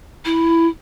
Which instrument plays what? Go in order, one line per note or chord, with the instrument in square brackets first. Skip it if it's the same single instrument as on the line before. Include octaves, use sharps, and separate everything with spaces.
[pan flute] E4